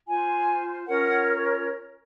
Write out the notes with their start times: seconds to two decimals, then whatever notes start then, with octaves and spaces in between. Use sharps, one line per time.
0.06 F4 C5 G#5
0.87 C#4 F4 A#4 C#5 F#5